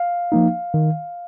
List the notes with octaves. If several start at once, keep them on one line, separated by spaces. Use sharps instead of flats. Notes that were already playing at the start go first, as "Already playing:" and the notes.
Already playing: F5
F3 A#3 D#4
D#3